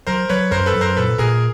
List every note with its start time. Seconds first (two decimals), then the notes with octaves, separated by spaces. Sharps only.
0.07 F#3 A#4 C5
0.29 F#3 B4 C#5
0.51 F#2 A#4 C5
0.66 A4 B4
0.74 F#2
0.81 A#4 C5
0.97 A#2 A4 B4
1.18 A#2 G#4 A#4